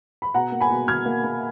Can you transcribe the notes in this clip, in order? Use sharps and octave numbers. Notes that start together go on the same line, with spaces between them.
B5
B2 F#5 A#5
A#3
G#5 B5
B2
B2 F6 G#6
A#3
A#3